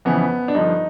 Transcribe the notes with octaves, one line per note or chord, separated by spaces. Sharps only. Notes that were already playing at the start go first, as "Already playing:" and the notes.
F2 C#3 E3 B3
D4
G2 D3 F3 D#4